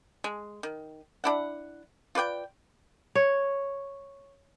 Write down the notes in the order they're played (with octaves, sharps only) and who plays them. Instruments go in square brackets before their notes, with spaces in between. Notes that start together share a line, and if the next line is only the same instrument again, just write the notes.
[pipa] G#3
D#3
D4 E4 F#5
F4 B4 D5 G5
[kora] C#5